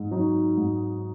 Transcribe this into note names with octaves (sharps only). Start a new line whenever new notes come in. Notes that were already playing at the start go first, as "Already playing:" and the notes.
Already playing: G#2
F#3 D#4
G#2